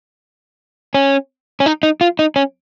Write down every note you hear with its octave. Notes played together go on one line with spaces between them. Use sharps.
C#4
C#4
D#4
D#4
F4
D#4
C#4